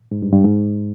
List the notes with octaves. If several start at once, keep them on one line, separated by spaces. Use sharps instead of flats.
G#2
G2
G2
G#2